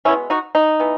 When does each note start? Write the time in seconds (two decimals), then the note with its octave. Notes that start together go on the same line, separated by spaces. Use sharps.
0.05 B2 G#3 B3 C#4 E4
0.30 D#4 F#4
0.55 D#4
0.80 E3 B3